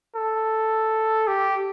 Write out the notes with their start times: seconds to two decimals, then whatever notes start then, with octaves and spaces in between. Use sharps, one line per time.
0.16 A4
1.27 G4